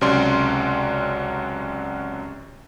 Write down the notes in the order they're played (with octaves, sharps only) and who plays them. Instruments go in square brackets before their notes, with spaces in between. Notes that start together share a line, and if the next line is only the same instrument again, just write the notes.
[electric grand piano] C#2 C3 F#3 C#4 D5 C6